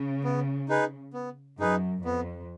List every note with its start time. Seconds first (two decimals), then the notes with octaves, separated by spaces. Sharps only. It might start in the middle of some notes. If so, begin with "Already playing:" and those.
Already playing: C#3
0.24 B3
0.69 D#4 G#4 B4
1.14 B3
1.59 F#2 D#4 G#4 B4
2.04 F2 B3